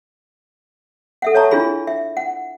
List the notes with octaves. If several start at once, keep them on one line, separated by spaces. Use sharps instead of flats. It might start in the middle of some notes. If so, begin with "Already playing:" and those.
A4 E5 F#5
C#5 D#5 E5 A5 A#5 C#6
D4 E4 F4 G#4 B5
E5
F#5